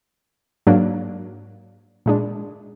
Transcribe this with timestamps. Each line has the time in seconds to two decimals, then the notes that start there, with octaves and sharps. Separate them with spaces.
0.67 G#2 F#3 A#3 D4
2.06 A#2 G#3 D4